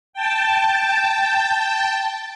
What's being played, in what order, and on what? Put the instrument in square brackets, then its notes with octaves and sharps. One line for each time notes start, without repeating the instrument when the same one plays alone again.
[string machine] G5 A5